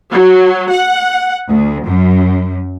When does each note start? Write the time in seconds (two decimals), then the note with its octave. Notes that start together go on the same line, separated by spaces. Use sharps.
0.12 F#3
0.71 F#5
1.49 D2
1.86 F#2